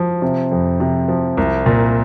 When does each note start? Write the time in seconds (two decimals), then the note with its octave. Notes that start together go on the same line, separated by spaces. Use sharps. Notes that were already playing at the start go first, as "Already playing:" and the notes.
Already playing: F3
0.22 C3
0.52 F2
0.80 C3
1.08 F3
1.37 C2
1.66 A#2